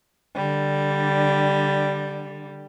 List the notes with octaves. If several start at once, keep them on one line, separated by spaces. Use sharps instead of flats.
D3 G3